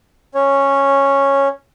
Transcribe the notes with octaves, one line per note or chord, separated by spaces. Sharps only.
C#4 C#5